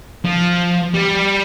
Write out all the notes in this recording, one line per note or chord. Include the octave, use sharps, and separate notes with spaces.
F3
G3